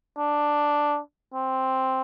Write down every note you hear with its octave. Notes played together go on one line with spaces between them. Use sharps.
D4
C4